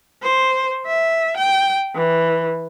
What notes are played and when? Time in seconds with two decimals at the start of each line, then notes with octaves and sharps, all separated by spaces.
0.23 C5
0.87 E5
1.37 G5
1.95 E3